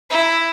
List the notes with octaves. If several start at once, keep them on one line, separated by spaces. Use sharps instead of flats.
E4